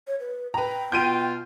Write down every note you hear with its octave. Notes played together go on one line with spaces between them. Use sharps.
C#5
B4
B4 G5 A#5
B2 F4 G6 D7 D#7